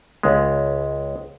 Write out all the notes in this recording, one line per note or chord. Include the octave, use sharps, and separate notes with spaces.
C#2 G#3